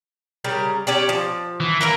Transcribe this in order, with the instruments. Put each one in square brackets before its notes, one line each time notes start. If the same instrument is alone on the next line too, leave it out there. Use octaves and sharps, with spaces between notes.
[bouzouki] C#3 G3 A#4
C#4 G4 D5
F3
[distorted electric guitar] E3
[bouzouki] E3 E4 A#4 [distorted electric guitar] A#3